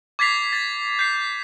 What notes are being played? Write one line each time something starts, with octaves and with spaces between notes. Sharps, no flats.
D6 G#6 A6 B6 C7 F7
A6
G6 C7